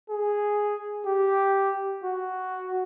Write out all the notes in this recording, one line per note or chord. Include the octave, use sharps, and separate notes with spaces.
G#4
G4
F#4